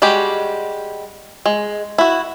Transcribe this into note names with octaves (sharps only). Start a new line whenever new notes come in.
G3 G#3 F#4 G4
G#3
E4 F#4